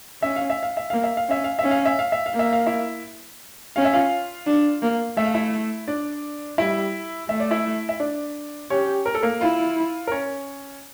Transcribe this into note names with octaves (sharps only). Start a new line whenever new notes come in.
C#4 E5
F5
E5
F5
E5
A#3 F5
E5
F5
C#4 E5
F5
C#4 E5
F5
E5
F5
E5
F5
A#3 E5
F5
E4 E5
C#4 F5
E5
F4 F5
D4
A#3
A3 E5
F5
E4 E5
D4 D5
G3 E4 E5
A3 E5
D5
E4 E5
E5
D4 D5
C#4 G4 C#5
A#4
A4
A#3 A#4
E4 F4
A#4
C#4 C#5